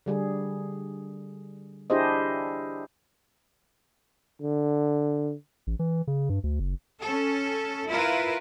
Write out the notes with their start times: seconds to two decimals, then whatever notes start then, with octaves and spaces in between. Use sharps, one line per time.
0.06 D3 G3 G#4
1.90 D4 E4 G4 G#4 C5 D#5
4.42 D3
5.67 A1
5.79 E3
6.07 C#3
6.29 G2
6.44 D2
6.60 F#1
7.01 C#4 A4
7.88 E4 F4 A#4 B4